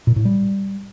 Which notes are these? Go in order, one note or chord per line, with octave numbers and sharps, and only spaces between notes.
A#2
A2
G3